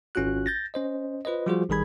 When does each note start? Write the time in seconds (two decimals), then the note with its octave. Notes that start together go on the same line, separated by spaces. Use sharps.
0.15 G#1 C#4 F4 F#4 F#6
0.46 G6 A6 A#6
0.74 C#4 C5 D#5
1.25 F4 B4 C5 D#5
1.46 F3 G3 F4 F#4 G#4 C5
1.69 A1 D#3 G3 G#4 B5 G#6